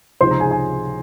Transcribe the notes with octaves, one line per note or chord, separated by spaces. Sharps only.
C#2 C3 F3 G#3 D#4 C5 C6
A#5
G#4 G#5
G#5